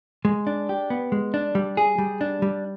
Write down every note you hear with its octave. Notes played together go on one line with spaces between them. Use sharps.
G#3
D4
G4
B3
G#3
D4
G3
G#4
G3
D4
G3